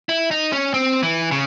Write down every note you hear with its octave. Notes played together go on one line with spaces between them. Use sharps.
E4
D#4
C#4
C4
E3
C#3